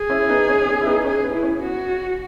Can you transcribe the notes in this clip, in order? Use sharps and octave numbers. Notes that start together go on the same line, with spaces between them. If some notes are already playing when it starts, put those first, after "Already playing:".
Already playing: G#4
C#4 E4
B3 D#4
C#4
C#4
E4
B3 D#4
C#4 G#4
B3
E4
C#4
F#4